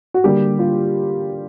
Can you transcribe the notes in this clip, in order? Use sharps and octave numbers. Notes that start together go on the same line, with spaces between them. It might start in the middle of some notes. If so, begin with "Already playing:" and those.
F#4
D3 G3 A#3 G4
F4